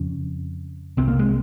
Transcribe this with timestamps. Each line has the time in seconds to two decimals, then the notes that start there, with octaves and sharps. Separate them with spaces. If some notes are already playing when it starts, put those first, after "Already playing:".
Already playing: F2 C#3
0.97 C2 C3 C4
1.08 A#3
1.19 G#3